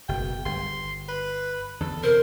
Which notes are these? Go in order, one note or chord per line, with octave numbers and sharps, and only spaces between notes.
F#1 B2 G5
G1 C6
B4
E2 D3 A4
C3 A#4 C5